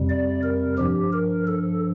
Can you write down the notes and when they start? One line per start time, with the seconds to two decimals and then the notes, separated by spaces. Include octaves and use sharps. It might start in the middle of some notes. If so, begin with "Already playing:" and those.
Already playing: F2 C3 G3
0.09 D5
0.43 A#4
0.77 G2 F3 G4
1.13 A#4
1.47 A4